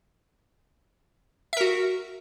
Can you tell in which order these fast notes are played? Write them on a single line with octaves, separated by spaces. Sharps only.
E5 A#4 F#4